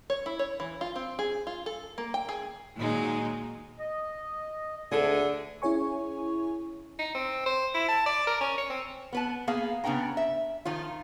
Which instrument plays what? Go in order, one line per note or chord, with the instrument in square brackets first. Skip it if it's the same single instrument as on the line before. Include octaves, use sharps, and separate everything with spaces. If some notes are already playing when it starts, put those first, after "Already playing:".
[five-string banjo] C#5
E4
C#5
E3
F4
C4
G#4
F4
A4
A#3
G5
G#4
[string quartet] A#2 D#3 F#3 G#3 D#4
[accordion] D#5
[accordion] D2 [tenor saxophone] D3 [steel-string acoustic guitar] G#4 A4
[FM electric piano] C#4 E4 G#4 C#5 G#5 C#6
[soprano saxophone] D#4
C4
C5
E4
A5
D5
A#4
C#4
C#5
C4
[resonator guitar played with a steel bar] B3 B4 A5
A#3 B3 G#4 F5
C#3 B3 D4 G5 A#5
E5
D#3 F3 F4